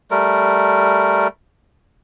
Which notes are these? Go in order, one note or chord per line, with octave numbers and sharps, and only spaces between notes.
G3 A3 A#4